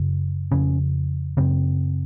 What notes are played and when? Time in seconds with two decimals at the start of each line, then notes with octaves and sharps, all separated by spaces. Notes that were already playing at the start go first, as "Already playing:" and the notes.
Already playing: F#2 C#3
0.52 F2 C#3 C#4
1.37 F#2 C#3 C4